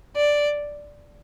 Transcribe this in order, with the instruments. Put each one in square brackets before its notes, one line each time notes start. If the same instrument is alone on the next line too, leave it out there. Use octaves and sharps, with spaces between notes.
[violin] D5